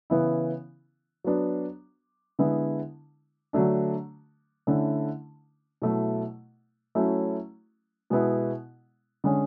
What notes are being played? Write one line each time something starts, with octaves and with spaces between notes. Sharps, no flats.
C#3 E3 B3 E4
F#3 B3 D4
D3 G#3 B3 E4
D3 F#3 A3 D4
D3 A3 C#4 E4
B2 F#3 A3 E4
F#3 A3 C#4 E4
B2 G#3 B3 E4
D3 G#3 C#4